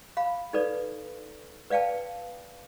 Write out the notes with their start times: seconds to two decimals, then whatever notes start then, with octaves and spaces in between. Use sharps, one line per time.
0.17 F5 B5
0.53 D#4 A4 B4 D5
1.70 B4 D5 F5 G5 A5